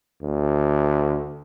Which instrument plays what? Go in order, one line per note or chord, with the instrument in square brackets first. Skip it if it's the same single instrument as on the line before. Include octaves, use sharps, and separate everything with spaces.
[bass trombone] D2